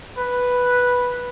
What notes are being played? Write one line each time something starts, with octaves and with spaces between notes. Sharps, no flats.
B4